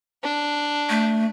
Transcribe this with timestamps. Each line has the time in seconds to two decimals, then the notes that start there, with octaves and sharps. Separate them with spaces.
0.23 D4
0.89 A3